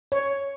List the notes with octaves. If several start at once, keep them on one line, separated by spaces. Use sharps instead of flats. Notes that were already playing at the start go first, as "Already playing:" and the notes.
C#5